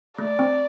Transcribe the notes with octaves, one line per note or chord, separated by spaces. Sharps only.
A3 D5
C4